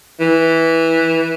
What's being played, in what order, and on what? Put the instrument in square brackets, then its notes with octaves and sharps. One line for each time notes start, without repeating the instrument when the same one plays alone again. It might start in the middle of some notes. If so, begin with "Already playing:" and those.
[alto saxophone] E3